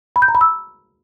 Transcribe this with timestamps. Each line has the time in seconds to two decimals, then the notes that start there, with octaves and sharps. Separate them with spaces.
0.16 B5
0.22 G6
0.28 A#5
0.35 B5
0.41 E6